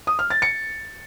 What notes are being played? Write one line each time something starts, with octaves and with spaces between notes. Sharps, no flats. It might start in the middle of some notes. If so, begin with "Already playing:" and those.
D#6
F6
A6
C#7